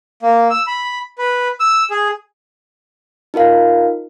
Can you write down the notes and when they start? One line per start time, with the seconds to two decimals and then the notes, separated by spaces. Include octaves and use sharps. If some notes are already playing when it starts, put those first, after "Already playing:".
0.22 A#3
0.50 E6
0.67 B5
1.18 B4
1.60 E6
1.90 G#4
3.34 D#4 F4 A#4 F5